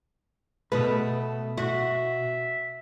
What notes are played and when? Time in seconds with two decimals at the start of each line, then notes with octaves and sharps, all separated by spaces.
0.72 B2 A3 B3 B4
1.58 F#4 E5